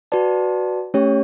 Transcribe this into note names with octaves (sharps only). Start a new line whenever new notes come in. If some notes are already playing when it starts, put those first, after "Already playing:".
F#4 B4 D5 A5
A3 C#4 G4 C#5